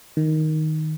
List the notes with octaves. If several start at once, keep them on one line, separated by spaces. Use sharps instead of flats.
D#3